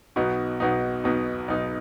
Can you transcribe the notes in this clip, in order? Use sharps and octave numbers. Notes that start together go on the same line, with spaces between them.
B1 B2 B3 D#4
B1 B2 B3 D#4
B1 B2 B3 D#4
B1 B2 B3 D#4